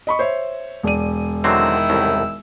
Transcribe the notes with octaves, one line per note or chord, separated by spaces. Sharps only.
D#5 B5 C#6
C5 C#5 E5
E1 D5 D#7
D3 D#3 F#3 C4 E4 E6
C2 A2